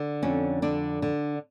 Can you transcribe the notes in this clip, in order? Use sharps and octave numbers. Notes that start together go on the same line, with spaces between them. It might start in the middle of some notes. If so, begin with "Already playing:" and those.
Already playing: D3
F2 C#4
D3 D4
D3